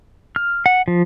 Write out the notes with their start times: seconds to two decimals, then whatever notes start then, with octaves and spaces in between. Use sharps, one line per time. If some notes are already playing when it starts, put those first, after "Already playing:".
0.36 F6
0.66 F#5
0.88 F3